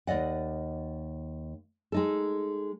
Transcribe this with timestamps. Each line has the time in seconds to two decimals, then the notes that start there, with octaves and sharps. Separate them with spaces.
0.07 D#2 D5 D#5 F#5
1.92 G#3 D#4 A4